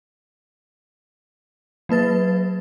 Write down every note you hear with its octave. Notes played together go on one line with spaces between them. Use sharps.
F#3 A#3 B4 A6